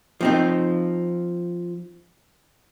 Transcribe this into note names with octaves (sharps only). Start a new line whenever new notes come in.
F3 C4 D#4